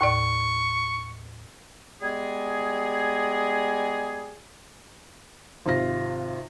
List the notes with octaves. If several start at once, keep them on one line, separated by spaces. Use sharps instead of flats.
D#2 A2 D5 C#6
G3 G#3 B3 G#4
G#1 C3 F4 A#6